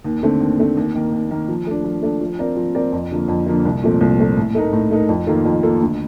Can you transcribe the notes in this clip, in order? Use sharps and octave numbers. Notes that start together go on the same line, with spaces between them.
D#2
D3 A3 C4
D#2
D3 A3 C4
D#2
D#3 A#3
D#2
D#3 A#3
F3
A3 D4
F3
A3 D4
F3
C4 F4 A#4 D5
F3
C4 F4 A#4 D5
F2
D3 F3 A#3 F4
F2
D3 F3 A#3 F4
C2
A#2 F3 A3 C4
C2
A#2 F3 A3 C4
A2
A3 D#4 A#4
A2
A3 D#4 A#4
F2
D#3 A#3 F4 A4
F2
D#3 A#3 F4 A4
D2